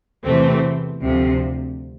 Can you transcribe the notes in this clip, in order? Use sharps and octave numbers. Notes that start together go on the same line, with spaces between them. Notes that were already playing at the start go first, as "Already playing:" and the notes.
E2 C3 E3 A3 C4
D2 C3 F3